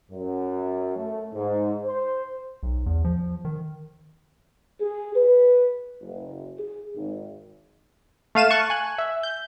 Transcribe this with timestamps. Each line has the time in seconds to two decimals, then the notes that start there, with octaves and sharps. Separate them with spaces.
0.11 F#2
0.96 A3
1.34 G#2
1.84 C5
2.63 B1
2.86 E2
3.04 F3
3.45 D#3
4.80 G#4
5.16 B4
6.01 F#1
6.58 G#4
6.96 G#1
8.35 A3 F5 D#7 E7
8.50 A5 C#6 F#6
8.70 G#5 F#6
8.98 E5
9.23 G6